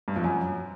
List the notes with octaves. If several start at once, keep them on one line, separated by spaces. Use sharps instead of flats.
G2
F2
F#2